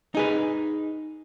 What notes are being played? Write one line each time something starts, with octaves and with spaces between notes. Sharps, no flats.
D#4 G#4 B4